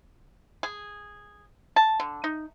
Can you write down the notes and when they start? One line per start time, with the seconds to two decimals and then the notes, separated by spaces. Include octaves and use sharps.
0.63 G#4
1.76 A5
2.00 D3
2.24 D#4